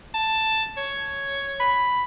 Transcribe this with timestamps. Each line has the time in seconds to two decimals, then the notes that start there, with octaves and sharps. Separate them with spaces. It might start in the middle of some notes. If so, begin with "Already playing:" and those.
0.14 A5
0.77 C#5
1.60 B5